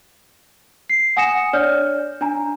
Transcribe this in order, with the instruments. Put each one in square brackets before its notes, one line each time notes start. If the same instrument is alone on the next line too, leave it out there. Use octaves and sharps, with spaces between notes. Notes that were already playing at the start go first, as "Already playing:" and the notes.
[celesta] C7
F#5 G#5 D#6 A#6 C#7 E7
D4 C#5 D5 F6 G6
D4 G#5 A#5